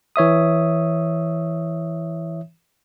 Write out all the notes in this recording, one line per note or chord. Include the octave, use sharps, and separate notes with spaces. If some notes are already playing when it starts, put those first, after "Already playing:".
E3 C#5 E5 D#6